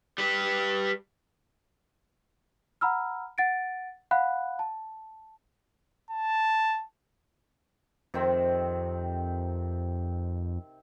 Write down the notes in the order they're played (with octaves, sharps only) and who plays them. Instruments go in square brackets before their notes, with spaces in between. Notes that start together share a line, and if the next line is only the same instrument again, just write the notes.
[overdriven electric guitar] G3 B4
[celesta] F#5 A#5 B5 E6 F6
F#5 A6 D7
F5 F#5 B5 F#6
A5
[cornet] A5
[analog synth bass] F2 [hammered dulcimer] C3 D#3 C4